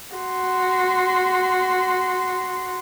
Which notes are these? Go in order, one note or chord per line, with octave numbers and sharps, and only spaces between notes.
F#4 C6